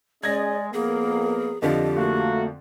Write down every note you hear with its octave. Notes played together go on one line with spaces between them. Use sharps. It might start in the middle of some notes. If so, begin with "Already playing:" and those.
G#3 C#4 G#4 D5 D#5 G#6 A#6
F2 A#3 B3 G#4 A#4
F2 D3 F3 G4 D#5
A3 A#3 F#4 F5